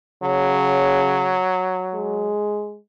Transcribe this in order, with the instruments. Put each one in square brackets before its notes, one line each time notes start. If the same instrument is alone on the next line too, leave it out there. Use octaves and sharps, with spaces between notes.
[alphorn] C#3 [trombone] F#3
[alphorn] G#3